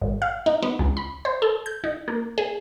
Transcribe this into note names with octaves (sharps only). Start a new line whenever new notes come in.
G#1
F5
D#4
B3
C#2
B5
C5
A4
G6
D#4
A#3
G#4